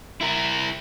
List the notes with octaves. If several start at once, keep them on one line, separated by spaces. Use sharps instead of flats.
E4 A#4